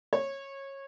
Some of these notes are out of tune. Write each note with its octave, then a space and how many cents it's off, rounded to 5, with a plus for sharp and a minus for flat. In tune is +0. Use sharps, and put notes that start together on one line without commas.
C#5 -20